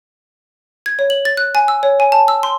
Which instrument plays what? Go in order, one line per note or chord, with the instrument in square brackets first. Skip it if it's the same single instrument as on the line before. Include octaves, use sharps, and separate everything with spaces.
[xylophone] G#6
C#5
F#7
A6
F#6
G#5
E6
C#5
G#5
A5
E6
C6